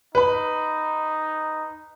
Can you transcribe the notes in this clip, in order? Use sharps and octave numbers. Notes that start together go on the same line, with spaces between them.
D#4 B4 B5